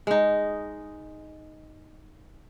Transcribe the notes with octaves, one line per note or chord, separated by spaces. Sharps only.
G#3 D#4